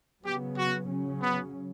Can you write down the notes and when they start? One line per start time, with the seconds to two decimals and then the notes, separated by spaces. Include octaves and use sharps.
0.24 C#3 F#3 B3 G4
0.57 F#4
0.88 C#3 F#3 C#4
1.20 B3